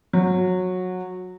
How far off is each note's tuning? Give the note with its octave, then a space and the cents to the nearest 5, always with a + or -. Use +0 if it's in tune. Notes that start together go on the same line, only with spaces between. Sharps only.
F#3 -15